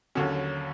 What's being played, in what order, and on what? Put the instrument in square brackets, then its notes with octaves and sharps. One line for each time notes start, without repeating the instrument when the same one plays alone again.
[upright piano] D#2 D3 F#3 C#4